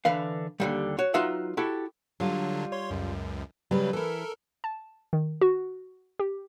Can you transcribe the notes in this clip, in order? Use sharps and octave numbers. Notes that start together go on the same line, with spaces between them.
D3 E3 B4 F5
D#2 D3 G3
F#4 C#5
F#3 D#4 F4 B4 E5 F#5
E4 F#4 G4 A4
D3 F#3 G3 D4 F4
C#5 C6
C#2 F#2
C#3 F#3 G3 B4
E3 E4 A4 A#4
A5
D#3
F#4
G4